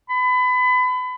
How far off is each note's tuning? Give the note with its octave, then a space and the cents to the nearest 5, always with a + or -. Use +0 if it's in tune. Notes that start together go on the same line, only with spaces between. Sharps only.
B5 +30